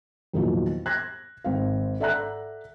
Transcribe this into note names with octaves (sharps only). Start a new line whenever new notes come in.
E2 A#2 D#3 F3 F#3
F#6 G#6 A#6
G#1 C4 F5
A4 D5 E5 F#5 A#5 F#6